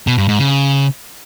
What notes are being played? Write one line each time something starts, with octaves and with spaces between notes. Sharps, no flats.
B2
G2
G#2
C#3